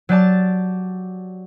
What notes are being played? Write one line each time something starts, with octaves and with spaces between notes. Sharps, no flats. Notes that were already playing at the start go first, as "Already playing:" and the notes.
F#3 G4 D5 A5